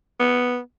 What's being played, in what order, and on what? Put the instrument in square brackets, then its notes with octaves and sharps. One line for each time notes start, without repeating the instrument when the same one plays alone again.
[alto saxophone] B3